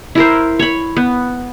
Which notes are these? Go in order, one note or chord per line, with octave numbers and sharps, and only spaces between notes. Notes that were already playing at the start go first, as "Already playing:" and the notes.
E4 A#4 C5
C#5 B5
B3